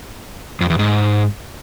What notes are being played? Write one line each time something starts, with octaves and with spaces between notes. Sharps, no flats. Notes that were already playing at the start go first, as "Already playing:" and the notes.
F2
E2
G#2